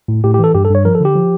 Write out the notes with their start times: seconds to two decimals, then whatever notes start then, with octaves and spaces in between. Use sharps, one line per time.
0.08 A2
0.24 A2 G4
0.34 G4
0.39 E3 A4
0.54 G2 G4
0.65 A4
0.70 G2
0.75 C#5
0.85 F3 A#4
0.95 A4
1.00 D3 G4
1.15 F3